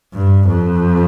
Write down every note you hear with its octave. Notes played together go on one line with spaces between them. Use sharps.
G2
F2